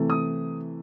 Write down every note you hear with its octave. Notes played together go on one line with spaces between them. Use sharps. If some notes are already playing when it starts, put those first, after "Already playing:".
Already playing: C3 E3 A3
D#6